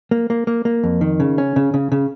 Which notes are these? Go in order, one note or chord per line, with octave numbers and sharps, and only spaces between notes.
A#3
A#3
A#3
A#3
F2
D#3
C#3
C#4
C#3
C#3
C#3